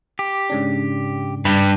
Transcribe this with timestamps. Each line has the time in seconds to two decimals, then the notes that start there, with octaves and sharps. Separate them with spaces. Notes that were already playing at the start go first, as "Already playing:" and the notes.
0.19 G4
0.50 G#2 C#3 D4
1.45 G2 B4